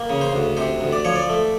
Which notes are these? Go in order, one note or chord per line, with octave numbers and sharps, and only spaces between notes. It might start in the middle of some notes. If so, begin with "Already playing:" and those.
Already playing: A#3
C#3
C5
D2
C3 C5
D2
D5
F3 C#5
D5
A3